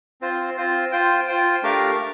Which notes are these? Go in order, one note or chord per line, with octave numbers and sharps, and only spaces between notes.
C4 F4 C5
C4 F4 C5
F4 C5 G5
F4 C5 G5
A3 D4 G4 A#4 F5